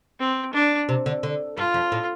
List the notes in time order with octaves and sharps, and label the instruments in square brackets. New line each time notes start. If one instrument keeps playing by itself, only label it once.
[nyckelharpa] C4
D4
[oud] C3
D3
D3
[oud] G2 [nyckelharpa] F4
[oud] F2
A2